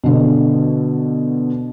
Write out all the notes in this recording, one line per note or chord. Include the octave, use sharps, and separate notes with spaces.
B2 D3